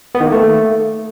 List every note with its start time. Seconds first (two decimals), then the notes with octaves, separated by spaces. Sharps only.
0.15 B3
0.20 D#3
0.26 A#3
0.32 A3